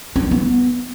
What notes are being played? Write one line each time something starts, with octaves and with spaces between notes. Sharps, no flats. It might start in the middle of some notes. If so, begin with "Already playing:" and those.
C#4
D#4
B3